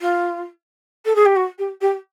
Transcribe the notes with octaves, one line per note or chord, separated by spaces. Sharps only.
F4
A4
G#4
G4
F#4
G4
G4